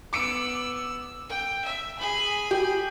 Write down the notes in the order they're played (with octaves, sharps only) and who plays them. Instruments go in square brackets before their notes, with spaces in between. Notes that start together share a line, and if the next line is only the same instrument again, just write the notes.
[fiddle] B3 E6 [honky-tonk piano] D6 C#7 D7
[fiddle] G5
E5
G#4 B5
[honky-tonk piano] G4